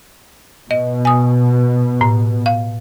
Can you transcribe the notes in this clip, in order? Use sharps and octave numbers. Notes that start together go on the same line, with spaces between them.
B2 D#5
G#5 D#6
A2
F5